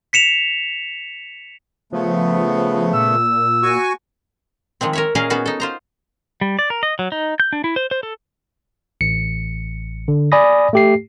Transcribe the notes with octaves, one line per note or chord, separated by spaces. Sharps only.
B6 C#7 E7 F7
C#3 F3 A3 B3
A#2 E6
F#4 G#5 C#6
D#3 F3 G#3 C4
A#4 C#5 E5
A#2 C#4 G#4 A#4 D#5 F5
B3 C#4 D#4 F#4 G#4
D#4 A4
F4 C5 A#5
G3
D5
A#4
D#5
F#3
D#4
G6
D4
E4
C5
C5
A4
A1 C#7
D3
D5 G#5 B5 D#6 A#6
A3 G4 C7